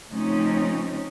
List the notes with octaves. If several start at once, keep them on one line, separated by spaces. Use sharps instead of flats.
C#3 F3 A3 C4 C#4 D#4